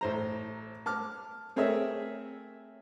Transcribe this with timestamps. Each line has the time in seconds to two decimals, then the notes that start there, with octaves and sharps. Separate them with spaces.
0.01 A1 C5 A#5
0.86 A5 D6 F6
1.56 A3 C4 G#4 A#4 C#5 E5